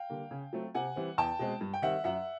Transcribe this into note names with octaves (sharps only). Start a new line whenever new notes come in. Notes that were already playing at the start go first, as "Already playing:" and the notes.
Already playing: F5 G5
D3 G3 A#3
C#3
F#3 A3 C4
C3 F#5 G#5
E3 G3 C4
E2 G5 A5
B2 G#3 C4
G2
G5
D#3 G3 C4 E5 F#5
F#2 E5 F#5